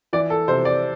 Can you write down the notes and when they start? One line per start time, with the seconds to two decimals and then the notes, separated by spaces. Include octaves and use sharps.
0.13 E3 D5
0.30 A4
0.48 C3 C5
0.65 D5